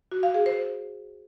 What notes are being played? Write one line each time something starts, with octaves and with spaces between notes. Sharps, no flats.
F#4
F5
G#4
C5